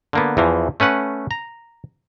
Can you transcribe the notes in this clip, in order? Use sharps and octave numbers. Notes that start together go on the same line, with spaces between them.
D3 A#3 B3
E2 E3 F3
A3 C#4 B4 F#5
A#5